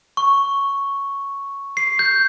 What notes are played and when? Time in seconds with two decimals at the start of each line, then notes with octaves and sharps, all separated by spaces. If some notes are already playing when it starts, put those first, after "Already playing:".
0.17 C#6
1.77 C7
1.99 G6